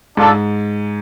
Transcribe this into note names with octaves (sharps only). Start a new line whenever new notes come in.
G#2 D4 F4 A4